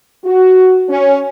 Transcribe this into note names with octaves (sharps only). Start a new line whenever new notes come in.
F#4
C#4